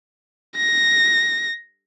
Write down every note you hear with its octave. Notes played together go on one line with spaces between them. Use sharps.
A#6